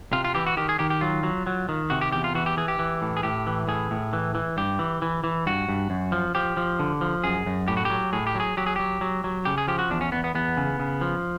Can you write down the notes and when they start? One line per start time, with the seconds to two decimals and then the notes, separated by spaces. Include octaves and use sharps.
0.12 C3 F4
0.24 F4
0.35 E3 G4
0.46 F#4
0.57 D#3 G4
0.69 G#4
0.79 D#3 G4
0.90 G4
1.01 F#3 F4
1.23 F#3
1.47 F#3
1.69 D#3
1.90 C3 F#4
2.01 G4
2.12 E2 G4
2.24 F4
2.35 E3 F#4
2.46 G4
2.57 E3 G#4
2.68 G4
2.79 E3
3.02 A2
3.17 G#4
3.23 A2 G4
3.47 E3
3.68 A2 G#4
3.91 A2
4.13 E3
4.35 E3
4.57 G2 G4
4.79 E3
5.02 E3
5.24 E3
5.46 G2 F#4
5.69 G2
5.90 F#2
6.12 F3
6.35 F3 G4
6.57 F3
6.79 D3
7.01 F3
7.24 F#2 G#4
7.46 F#2
7.68 A2 G4
7.77 F#4
7.85 F#3 G4
8.13 A2 G#4
8.27 G4
8.35 F#3 G#4
8.57 F#3 G4
8.66 G#4
8.76 F#3 G4
9.01 F#3
9.24 F#3
9.45 C#3 G4
9.58 G#4
9.68 F3 G4
9.79 F#4
9.90 E2 D4
10.01 C#4
10.12 E2 B3
10.24 B3
10.35 E2 B3
10.57 C#3
10.80 C#3
11.01 F3